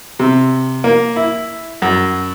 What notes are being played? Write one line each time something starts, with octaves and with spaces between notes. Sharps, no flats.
C3
A#3
E4
F#2